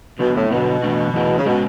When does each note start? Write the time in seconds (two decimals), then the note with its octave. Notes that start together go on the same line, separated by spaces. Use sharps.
0.19 B2 D3 F#3 B3
0.35 A2
0.50 B2 D3 F#3 B3
0.82 E3 A3 D4 F#4
1.14 E3 A3 E4 G#4
1.38 C#3
1.46 B2 G#3 C#4 F#4